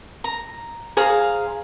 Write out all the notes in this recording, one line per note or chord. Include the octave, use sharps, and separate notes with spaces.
A#5
G#4 C5 F5 A#5